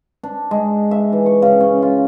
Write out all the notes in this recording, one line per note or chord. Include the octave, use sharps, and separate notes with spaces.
D4
G#3
E5
E3
C#6
C#3
C#4
F4